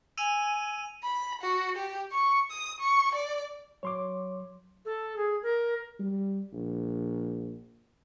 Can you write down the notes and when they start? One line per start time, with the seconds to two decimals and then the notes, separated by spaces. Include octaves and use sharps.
0.17 G#5 E6 D#7 F7
1.04 B5
1.41 F#4
1.76 G4
2.12 C#6
2.51 D#6
2.80 C#6
3.15 D5
3.83 F#3 C#5 C6 D6
4.85 A4
5.16 G#4
5.42 A#4
5.99 G3
6.53 A#1